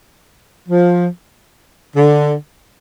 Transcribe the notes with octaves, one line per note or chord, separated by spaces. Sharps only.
F3
D3